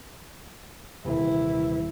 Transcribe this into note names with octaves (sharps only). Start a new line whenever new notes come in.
D#1 C3 E3 A#3 E4